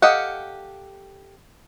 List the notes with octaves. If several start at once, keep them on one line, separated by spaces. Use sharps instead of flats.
G4 A4 D#5 F5 F#5